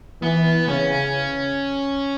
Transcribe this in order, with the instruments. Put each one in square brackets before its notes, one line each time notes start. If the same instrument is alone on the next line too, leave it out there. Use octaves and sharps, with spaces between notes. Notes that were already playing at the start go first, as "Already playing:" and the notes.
[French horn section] E3 [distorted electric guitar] B3
[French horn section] C#3 [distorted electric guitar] C#4